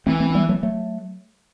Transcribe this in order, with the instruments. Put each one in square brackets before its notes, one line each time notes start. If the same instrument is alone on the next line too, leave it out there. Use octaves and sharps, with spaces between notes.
[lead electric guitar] E3 [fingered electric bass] A3 C4
[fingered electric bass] A3 C4
C4
G3 B3
F#3 A3
F#3 A3